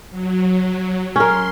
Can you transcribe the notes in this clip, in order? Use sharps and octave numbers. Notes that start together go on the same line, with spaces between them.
F#3
C#4 A#4 C6